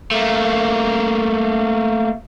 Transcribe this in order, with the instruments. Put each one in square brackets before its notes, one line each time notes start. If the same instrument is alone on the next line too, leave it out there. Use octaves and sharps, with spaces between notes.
[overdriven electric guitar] A3 A#3